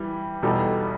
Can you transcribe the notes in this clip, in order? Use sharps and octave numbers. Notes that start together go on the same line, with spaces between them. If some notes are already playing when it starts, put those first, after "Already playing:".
Already playing: E3 G3
E2 B2 G3 D#4 A4